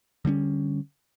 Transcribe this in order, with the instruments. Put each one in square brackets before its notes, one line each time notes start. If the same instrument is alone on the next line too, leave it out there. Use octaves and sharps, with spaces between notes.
[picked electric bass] D3 G3 C4 C#4